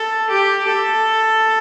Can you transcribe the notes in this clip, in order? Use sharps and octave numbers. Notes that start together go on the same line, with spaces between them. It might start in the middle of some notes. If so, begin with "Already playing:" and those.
Already playing: A4
G4
A4